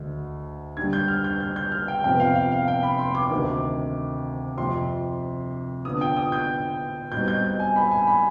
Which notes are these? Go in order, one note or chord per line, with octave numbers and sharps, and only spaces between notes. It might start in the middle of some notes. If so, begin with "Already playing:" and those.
Already playing: D2 D3 G#3
D3 G3 D4 G#6
G6
F6
G6
G6
G6
F6
G5
F2 C3 F3 B3 F4 G5
F5
F5
F5
G5
B5
C6
D6
D2 C3 D#3
F2 C3 F3 C6
D3 F3 B3 D#6
G5
D#6
G6
B2 G3 C4 D#4 G6
G6
G6
G#5
B5
G#5
B5